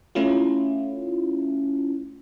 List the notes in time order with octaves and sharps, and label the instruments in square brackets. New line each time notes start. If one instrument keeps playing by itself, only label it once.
[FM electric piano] A3 C#4 E4 F4